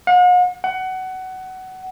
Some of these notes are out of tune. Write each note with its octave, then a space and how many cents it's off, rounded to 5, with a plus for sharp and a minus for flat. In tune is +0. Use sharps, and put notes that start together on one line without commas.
F#5 -45
F#5 +20